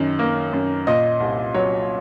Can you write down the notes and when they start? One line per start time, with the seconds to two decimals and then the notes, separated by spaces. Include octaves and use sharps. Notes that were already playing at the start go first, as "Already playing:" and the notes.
Already playing: F#2 D#3
0.19 A#3
0.53 F#2
0.87 A#2 D#5
1.20 C2
1.54 F#3 C#5